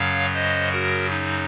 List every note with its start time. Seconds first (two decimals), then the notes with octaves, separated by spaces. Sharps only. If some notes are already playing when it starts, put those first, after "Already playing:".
Already playing: F#2 C#3 F#3 C#5 F5
0.34 C5 D#5
0.72 F#4 A#4
1.10 D#4